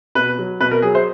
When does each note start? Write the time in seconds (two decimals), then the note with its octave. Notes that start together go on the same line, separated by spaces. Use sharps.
0.15 B2 B4
0.39 F#3
0.60 B2 B4
0.71 A#4
0.82 F#3 G#4
0.95 C5